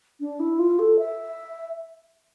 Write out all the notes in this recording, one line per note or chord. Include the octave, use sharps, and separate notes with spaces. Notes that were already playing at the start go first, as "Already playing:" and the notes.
D4
E4
F4
A4
E5